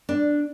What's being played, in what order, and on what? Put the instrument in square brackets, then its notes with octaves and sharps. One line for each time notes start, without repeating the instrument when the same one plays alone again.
[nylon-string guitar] D4